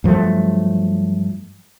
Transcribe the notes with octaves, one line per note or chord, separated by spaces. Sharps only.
G2 F3 F#3 A3